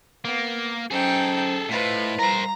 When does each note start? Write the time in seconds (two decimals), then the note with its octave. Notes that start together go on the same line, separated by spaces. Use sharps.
0.25 A#3 B3
0.91 F#3 C#4 D#4 G#4 A4 C5 G5
1.69 A2 E4 F4 B4 C5 D#5
2.19 G3 A#4 C5 A#5